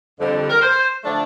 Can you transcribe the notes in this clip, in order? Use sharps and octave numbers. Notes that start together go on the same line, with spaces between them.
F2 D3 G3
A#4
C5
D3 F3 A3 D4